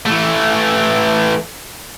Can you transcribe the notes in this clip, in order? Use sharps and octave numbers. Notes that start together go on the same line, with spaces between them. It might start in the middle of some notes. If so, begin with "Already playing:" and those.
E3 A3